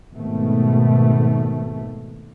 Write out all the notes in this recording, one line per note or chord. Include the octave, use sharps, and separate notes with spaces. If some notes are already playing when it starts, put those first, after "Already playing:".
G#1 B2 A3